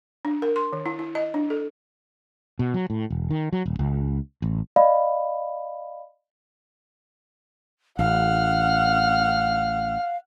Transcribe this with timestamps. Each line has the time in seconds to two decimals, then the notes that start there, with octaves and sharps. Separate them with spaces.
0.25 D4
0.42 A#4
0.56 C6
0.73 D#3
0.86 E4
0.99 E4
1.15 D#5
1.34 D4
1.50 A4
2.59 B2
2.74 F#3
2.90 A2
3.10 E1
3.31 D#3
3.53 F#3
3.66 D#1
3.79 C#2
4.42 A1
4.76 D5 D#5 F5 B5
7.99 A1 F5 F#5 F6